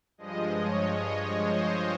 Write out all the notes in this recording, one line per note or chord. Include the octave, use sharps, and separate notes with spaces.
G2 F3 G#3 D#5
C#5
C#5
C5